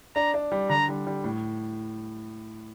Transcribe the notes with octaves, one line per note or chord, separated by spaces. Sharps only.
D4 A#5
D4
G3
D3 A#5
G3
G3
A2